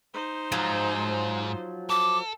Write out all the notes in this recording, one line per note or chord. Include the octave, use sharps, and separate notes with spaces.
D#4 C5
G#2 F3 F#3
A4 D6